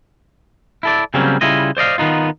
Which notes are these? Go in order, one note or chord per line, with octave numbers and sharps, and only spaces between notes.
E4 A4 D5
C#3 F#3 G3 A#3 C4 C#4
C#3 G3 E4 F4 D#5
C5 D5 D#5 F5
D#3 B3 D#4 F4